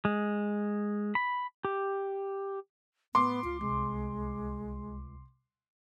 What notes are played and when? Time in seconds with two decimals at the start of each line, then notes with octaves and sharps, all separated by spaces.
0.05 G#3
1.15 B5
1.65 G4
3.15 A2 B3 C6 D6
3.44 C#2 F4
3.61 C2 G#3